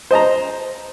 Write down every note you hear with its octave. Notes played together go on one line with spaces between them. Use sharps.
C5 D#5 A5 A#5